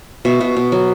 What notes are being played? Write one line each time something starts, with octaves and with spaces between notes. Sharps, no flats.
B2 E5
B2
B2
F#3